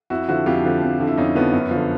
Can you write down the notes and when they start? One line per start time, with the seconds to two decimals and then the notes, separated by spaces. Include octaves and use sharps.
0.10 F2 E4 F#4
0.28 D3 F3 E4 F#4
0.46 F2 F4 G4
0.64 D3 F3
0.82 F2
1.00 D3 F3
1.07 E4
1.17 F2 C#4 D#4
1.35 D3 F3 B3 C#4
1.53 F#2
1.71 D3 F3